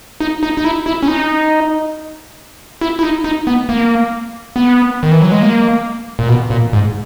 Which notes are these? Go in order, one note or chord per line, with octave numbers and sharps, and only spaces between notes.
D#4
D#4
D#4
E4
E4
C#4
D#4
E4
E4
D#4
D#4
B3
A#3
B3
D#3
E3
F#3
G#3
A#3
A#2
B2
A#2
G#2